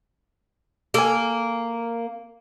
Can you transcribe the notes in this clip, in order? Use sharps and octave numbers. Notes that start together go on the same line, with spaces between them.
A#3 A4 G#5